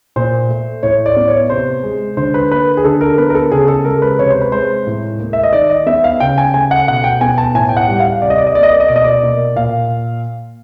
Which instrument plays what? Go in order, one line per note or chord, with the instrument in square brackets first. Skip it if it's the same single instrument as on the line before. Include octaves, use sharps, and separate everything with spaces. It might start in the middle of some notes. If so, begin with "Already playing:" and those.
[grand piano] A#2 C5
A3
A2 C#5
D5
B3
C#5
C3 C5
G#3
D3 C5
B4
A#3 B4
G#4
D3 A4
A#4
B3 B4
A#4
A4
C#3 G#4
A4
G#3 A#4
B4
C3 C#5
C5
B4
G#3 C5
A2
A#3
E5
D#5
D#3 D5
D#5
B3 E5
F5
C#3 G5
G#5
A3 G#5
F#5
B2 F#5
G5
B3 G#5
A5
A2 G#5
G5
F#5
G3
F5
C3 D5
D#5
D5
D#5
A#3 D5
D#5
D5
D#5
B2 D5
D#5
D5
A#3
A#2 F5